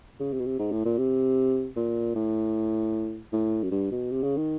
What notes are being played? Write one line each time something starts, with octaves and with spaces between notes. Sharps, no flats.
C#3
C3
B2
C3
G#2
A2
A#2
C3
A#2
A2
A2
F#2
G2
B2
C3
C#3
D#3